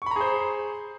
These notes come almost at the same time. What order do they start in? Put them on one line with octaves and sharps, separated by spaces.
C#6 B5 A#5 G#4 C5